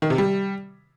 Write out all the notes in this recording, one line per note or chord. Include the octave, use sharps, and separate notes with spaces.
D#3
C3
G3